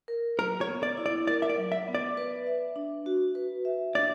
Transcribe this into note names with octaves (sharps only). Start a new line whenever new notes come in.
A#4
F#3 A#4
C#5
B3
D5
E4
D5
A#4 D5
E5
D5
F#3
E5
B3
D5
B4
E5
D4
F#4
B4
E5
D4 D5